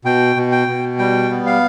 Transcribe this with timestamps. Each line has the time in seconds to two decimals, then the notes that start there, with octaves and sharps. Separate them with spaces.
0.05 B2 G5
0.36 B2
0.52 G5
0.68 B2
0.98 G3 G5
1.31 B3
1.46 F5